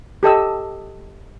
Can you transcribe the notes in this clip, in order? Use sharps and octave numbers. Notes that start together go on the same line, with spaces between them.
G4 A4 D#5 E6